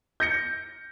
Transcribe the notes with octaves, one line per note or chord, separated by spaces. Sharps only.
G6 A#6 C#7